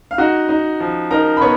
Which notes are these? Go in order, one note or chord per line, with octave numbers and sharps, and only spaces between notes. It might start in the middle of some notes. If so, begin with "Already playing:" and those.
F5
D#4 F#4 F#5
D#4
F3
D#4 A#4 A#5
B5
B3 C#5 C#6